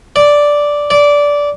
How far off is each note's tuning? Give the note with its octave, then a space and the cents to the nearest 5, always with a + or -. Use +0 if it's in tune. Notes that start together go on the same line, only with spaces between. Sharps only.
D5 -5
D5 -15